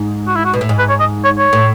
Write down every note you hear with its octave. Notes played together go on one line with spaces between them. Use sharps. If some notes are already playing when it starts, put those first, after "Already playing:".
Already playing: G#2
F#4
E4
F#4
B2
A2
G#2
B4
C#5
D#5
C#5
C#5
A2